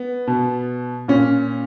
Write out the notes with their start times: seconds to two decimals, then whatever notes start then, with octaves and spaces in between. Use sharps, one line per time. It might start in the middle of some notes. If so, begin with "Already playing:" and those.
Already playing: B3
0.27 B2
1.08 A#2 C#4